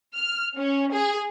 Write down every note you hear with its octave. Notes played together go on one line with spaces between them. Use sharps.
F6
C#4
G#4